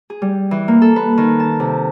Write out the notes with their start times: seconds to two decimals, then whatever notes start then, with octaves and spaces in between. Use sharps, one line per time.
0.10 G#4
0.22 G3
0.51 E3
0.68 A#3
0.82 A4
0.96 B4
1.18 D#3
1.40 A5
1.60 C3